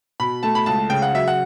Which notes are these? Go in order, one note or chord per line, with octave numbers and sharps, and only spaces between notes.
B2 B5
A3 A5
B5
C#2 A5
C#3 G5
F#5
F#3 E5
F#5